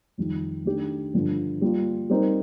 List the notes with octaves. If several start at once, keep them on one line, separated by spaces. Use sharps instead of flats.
F2 D#3 G3
D#3 A3 D4 G4
G2 D3 F3
G3 A#3 F4
G3 C4 D#4 A#4